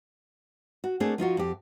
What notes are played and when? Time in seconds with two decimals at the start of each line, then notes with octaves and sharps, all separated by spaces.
0.84 F#4
1.00 A3 A#3 C4 D4 G#4
1.18 F3 D#4 F4 F#4
1.37 F2 G4